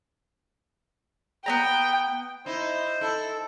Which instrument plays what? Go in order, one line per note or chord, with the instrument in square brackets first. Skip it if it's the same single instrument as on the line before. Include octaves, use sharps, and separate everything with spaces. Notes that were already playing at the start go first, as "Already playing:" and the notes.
[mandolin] B3 C4 A#5 [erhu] G5
[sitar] D#4 [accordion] E4 [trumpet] C5
[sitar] E4 [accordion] A4